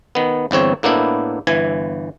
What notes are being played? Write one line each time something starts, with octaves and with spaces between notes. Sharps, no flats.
D#3 B3
G1 E2 C4 C#5
A2 A#3 B3 D4 E4
G1 E3 G#5